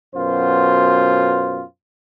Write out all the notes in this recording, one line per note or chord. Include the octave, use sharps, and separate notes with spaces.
F#2 B2 F4 C5